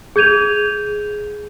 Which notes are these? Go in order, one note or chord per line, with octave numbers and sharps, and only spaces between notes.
G#4 G6 G#6 D#7 F7